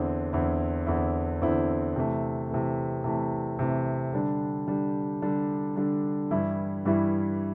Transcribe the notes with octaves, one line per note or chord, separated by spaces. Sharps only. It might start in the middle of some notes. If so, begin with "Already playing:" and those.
Already playing: E2 D3 C4 E4
E2 D3 C4 E4
E2 D3 C4 E4
E2 D3 C4 E4
C3 E3 A3
C3 E3 A3
C3 E3 A3
C3 E3 A3
D3 G3 D4
D3 G3 D4
D3 G3 D4
D3 G3 D4
G2 E3 G3 E4
G2 E3 G3 E4